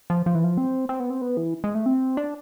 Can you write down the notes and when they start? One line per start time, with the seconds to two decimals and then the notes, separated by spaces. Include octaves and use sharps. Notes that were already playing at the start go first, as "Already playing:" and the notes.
0.10 F3
0.26 F3
0.35 E3
0.44 F3
0.58 C4
0.89 C4
1.00 B3
1.10 C4
1.22 B3
1.37 E3
1.64 G#3
1.75 A3
1.86 C4
2.17 D4